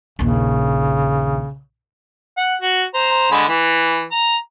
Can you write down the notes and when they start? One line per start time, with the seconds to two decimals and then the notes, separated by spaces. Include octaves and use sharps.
0.19 A#1 D#2 C#3
2.37 F#5
2.62 F#4
2.94 C5 A#5
3.31 D3 G#3 B5
3.48 E3
4.12 A#5